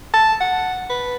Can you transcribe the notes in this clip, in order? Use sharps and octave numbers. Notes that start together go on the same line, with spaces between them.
A5
F#5
B4